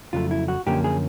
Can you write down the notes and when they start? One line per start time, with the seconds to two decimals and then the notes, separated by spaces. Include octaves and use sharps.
0.13 F2 C#3 F#3 A3 F4
0.31 E4
0.48 F#4
0.66 F#2 D3 F3 A#3 C#4 G4
0.84 G#4